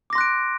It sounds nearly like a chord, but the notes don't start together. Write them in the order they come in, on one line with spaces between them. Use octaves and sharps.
D6 A#6 C6 F#6 D7